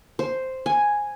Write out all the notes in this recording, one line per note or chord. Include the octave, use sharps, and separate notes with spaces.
C5
G#5